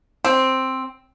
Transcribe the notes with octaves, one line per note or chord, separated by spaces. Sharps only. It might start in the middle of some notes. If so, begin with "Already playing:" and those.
C4